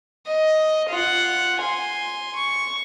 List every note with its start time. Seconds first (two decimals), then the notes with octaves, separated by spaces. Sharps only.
0.27 D#5
0.89 F4 F#5
1.60 G#5 C6
2.36 C#6